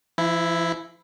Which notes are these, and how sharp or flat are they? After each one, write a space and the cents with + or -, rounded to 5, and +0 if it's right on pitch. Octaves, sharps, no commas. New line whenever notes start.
F3 -45 E4 +0